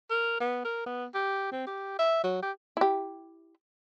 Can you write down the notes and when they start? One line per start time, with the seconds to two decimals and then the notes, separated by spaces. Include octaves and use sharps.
0.10 A#4
0.40 B3
0.65 A#4
0.86 B3
1.15 G4
1.52 C4
1.67 G4
1.99 E5
2.24 F#3
2.43 G4
2.77 E4 G4